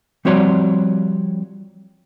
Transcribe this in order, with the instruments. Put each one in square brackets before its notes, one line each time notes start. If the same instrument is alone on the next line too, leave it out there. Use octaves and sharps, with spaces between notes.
[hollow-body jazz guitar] F3 G3 C4 F#4 C#5 D5